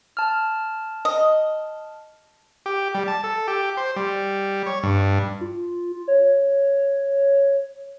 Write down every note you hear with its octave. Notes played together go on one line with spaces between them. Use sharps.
A5 F6
D#5
G4
G3
A5
A4
G4
C5
G3
C#5
G2
F4
C#5